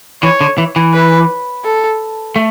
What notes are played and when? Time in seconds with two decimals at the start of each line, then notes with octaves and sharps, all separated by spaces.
0.23 E3 C#5
0.41 D3
0.58 E3
0.76 E3
0.93 B4
1.65 A4
2.36 A3